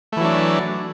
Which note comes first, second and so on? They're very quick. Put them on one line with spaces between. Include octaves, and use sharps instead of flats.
A3 E3 F#3 D4